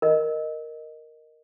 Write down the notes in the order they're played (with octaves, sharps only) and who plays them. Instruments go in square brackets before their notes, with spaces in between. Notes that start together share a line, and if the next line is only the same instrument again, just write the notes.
[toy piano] A#4 D#5